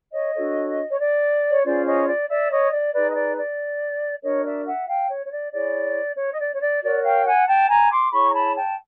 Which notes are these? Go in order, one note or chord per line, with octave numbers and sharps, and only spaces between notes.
C#5 D#5
D4 F#4 A4 C#5
C#5
D5
C#5
C#4 F4 G#4 C5 D5
C#5 D#5
D5
D5 E5
C#5 D#5
D5
D#4 G#4 B4 D5
D#5
D5
D5
D4 F#4 A#4 C#5 D#5
D5 E5
E5 F#5
F5 G5
C#5
C#5
D5
E4 G#4 C#5 D5
C#5
D#5
D5
C#5
D5
F#4 A#4 C#5 D5
F5 G5
F#5 G#5
G5 A5
G#5 A#5
C6 D6
E4 G#4 C#5 B5 C#6
A#5
A5 B5
G5 A5